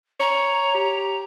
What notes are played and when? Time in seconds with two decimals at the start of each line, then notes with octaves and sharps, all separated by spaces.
0.20 C#5 A#5
0.75 G4